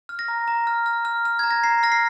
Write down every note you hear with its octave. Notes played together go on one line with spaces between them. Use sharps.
F6
A#6
A#5
A#5
F6
F6
F6
F6
A#5 G#6
A#6
A#5 C7
F6 A#6
C7